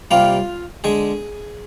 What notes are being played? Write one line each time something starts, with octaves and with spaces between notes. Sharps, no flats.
C3 G3 A#3 F4 F5
D3 G#3 G#4 G#5